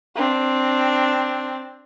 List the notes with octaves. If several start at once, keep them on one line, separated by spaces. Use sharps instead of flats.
C4 D4